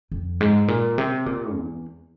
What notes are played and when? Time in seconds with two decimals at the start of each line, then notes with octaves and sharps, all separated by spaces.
0.12 F2
0.41 G#2
0.68 A#2
0.98 C3
1.26 A#2
1.54 E2